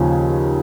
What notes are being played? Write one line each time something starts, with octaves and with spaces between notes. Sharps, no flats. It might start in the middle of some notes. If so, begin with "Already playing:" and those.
Already playing: D#2 C#3 F3